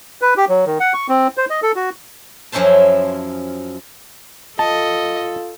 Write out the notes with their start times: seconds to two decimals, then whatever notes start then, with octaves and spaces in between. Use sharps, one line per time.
0.22 B4
0.37 G4
0.49 F#3
0.66 D#3
0.80 F#5
0.94 C#6
1.09 C4
1.37 C5
1.50 D#5
1.63 A4
1.75 F#4
2.52 F#2 F3 C#4 E4 C5 A5
4.59 F4 A4 D#5 A5